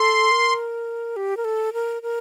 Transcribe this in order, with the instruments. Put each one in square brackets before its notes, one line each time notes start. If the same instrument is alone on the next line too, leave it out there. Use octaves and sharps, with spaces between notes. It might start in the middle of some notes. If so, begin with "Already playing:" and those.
Already playing: [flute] A4 [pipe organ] C6
[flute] A#4
G4
A#4
A4
A#4
A#4